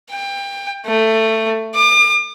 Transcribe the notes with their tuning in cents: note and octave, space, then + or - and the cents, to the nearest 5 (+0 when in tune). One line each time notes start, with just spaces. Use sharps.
G5 +25
A3 +15
D6 +40